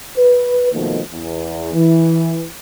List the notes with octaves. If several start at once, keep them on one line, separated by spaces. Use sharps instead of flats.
B4
B2 D#3 F3 A3 A#3
E2
E3